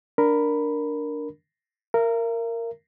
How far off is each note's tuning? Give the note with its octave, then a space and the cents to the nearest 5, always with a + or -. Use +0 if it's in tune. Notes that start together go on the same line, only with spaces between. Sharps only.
D4 +0 A#4 +0 B5 +5
A#4 -10 E5 +45